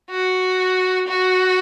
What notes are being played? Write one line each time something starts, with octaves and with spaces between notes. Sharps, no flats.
F#4
F#4